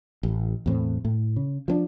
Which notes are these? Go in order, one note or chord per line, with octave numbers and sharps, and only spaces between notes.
A1
E2 A2 C4
A2
C#3
F3 B3 D4